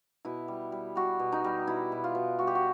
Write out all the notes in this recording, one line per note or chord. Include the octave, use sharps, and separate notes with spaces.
B2 E4
G3
G3
G3 F#4
B2
D#4
G3
B2 E4
B2
F4
B2
G3 F#4
G4
F#4